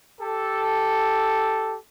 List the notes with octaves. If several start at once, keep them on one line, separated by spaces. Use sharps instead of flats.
G4 A4